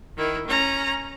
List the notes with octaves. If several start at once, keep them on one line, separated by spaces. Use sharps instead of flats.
D#3 E4
C#4 A#5